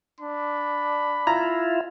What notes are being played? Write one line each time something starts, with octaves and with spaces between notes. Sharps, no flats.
D4 B5
E4 F4 A#5